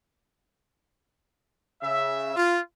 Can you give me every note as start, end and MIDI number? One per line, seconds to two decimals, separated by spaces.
1.82 2.31 49
1.82 2.31 76
2.36 2.59 65